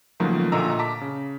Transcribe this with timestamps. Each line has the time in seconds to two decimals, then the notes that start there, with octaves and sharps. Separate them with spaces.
0.20 C#2 D#3 F3 F#3 A3 A#3
0.52 A#1 A#2 D3 D#5 A#5 E6
0.79 A5 A#5 D6 B6
1.01 C#3